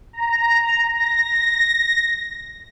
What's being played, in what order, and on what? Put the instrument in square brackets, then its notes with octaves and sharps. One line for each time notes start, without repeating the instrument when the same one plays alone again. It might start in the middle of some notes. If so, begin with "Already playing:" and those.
[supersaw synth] A#5
A#6